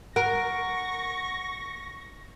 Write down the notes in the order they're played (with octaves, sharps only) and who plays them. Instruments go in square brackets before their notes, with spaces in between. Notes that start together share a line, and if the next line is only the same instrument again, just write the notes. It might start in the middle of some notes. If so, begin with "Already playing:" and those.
[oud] A#4 [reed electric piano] F#5 [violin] C#6 A#6